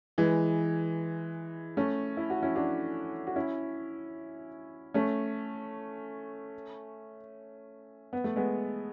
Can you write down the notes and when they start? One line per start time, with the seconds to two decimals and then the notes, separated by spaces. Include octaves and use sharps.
0.18 E3 G#3
1.77 A3 C#4
2.17 E4
2.30 F#4
2.43 C#4 E4
2.56 D4 F#4
3.27 F#4
3.36 C#4 E4
4.94 A3 C#4
8.13 B3
8.24 A3
8.36 G#3 B3